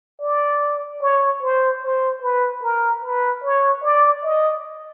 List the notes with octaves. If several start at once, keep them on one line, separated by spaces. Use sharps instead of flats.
D5
C#5
C5
C5
B4
A#4
B4
C#5
D5
D#5